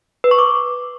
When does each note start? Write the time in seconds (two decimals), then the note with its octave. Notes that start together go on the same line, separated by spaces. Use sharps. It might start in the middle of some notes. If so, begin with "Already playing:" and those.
0.24 B4
0.31 C#6
0.39 D6